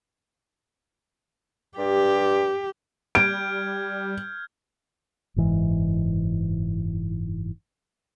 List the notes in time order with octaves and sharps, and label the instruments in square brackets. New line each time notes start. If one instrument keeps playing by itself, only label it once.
[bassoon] G2 [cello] G4
[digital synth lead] G3 [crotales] F6 G6 G#6 [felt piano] D7
[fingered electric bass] F#1 G#2 E3